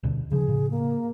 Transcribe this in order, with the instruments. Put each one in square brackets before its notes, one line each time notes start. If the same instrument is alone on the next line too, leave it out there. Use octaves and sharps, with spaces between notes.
[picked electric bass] D2 B2 D3
[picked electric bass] C#3 F3 [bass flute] G#4
[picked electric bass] A2 C#3
[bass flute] A#3